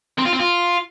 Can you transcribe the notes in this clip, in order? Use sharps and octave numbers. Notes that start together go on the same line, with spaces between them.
C4
F4
C4
F4